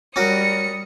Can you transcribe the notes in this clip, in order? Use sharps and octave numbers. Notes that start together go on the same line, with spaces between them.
G3 C#4 F#4 A#4 D#6 C#7